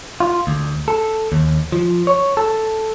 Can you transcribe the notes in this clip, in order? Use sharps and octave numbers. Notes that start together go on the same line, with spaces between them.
F4
D2
A4
D#2
F3
C#5
A4